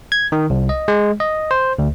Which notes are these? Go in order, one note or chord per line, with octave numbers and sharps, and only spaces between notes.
G#6
D#3
C2
D#5
G#3
D#5
C5
D2